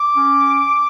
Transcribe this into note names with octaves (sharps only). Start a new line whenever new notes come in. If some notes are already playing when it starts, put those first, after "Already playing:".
Already playing: D6
C#4